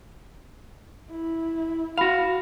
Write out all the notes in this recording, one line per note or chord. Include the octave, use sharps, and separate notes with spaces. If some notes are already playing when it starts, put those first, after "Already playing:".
E4
F#4 F5 B5 F7